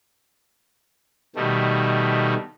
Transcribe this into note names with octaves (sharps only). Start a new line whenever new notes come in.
B2 D#3 G3 A3